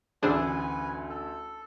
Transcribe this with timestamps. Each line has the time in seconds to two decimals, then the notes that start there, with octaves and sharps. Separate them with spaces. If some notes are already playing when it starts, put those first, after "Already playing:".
0.23 A1 D2 D4 G#4 B4 C5 G#5 E6
1.10 A4